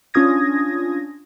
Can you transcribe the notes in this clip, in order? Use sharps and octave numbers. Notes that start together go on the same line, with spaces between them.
C#4 D4 F4 D#6 G#6 A#6